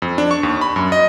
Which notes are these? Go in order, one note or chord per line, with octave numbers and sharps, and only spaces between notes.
F2
D4
C#6
D#2
B5
F#2
D#5